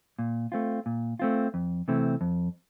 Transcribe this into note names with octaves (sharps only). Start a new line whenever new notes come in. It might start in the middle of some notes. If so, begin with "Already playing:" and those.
A#2
A3 C4 F4
A#2
A3 C4 F4
F2
C3 E3 A3 C4
F2